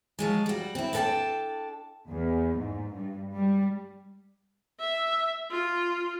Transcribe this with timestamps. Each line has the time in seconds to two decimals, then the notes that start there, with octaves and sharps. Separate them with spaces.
0.19 F3 F#3 G#3
0.46 G3 F#4
0.75 C4 E4
0.93 D4 A4 A#4 F#5 G5 A5
2.10 E2
2.58 G#2
2.94 G2
3.36 G3
4.79 E5
5.51 F4